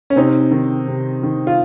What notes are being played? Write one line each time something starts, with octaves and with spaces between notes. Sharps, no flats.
C#4
C3 C4 D#4
D#3
C3
D#3
F4